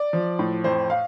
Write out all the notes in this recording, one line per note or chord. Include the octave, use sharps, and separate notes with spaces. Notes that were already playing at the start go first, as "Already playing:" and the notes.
Already playing: D5
F3
A2
F2 C5
F5